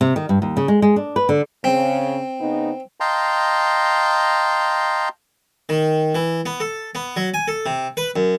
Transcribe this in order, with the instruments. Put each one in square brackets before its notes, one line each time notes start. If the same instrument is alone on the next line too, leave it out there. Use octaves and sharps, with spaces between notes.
[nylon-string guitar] C3
D#3
G2
D#2
C#3
G#3
G#3
D4
B4
D3
[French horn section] C#3 [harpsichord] C4
[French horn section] C#3 B3 D#4
[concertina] D#5 F5 G5 A5 A#5 C6
[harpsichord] D#3
E3
B3
A4
B3
F#3
G#5
A4
C3
B4
F#2